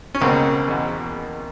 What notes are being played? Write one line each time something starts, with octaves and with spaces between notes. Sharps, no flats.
C#4
C#2 B2 A#3 C4
E2 B2